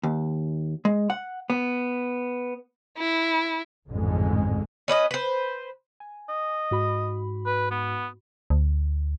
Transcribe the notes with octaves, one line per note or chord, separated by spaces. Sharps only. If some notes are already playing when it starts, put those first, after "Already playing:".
D#2
G#3
F#5
B3
E4
A1 F2 G#2 D3 G#3
C#4 B4 D5 D#5
B4 C5
G#5
D#5
G#2 F#4 B5
B4
B3
D2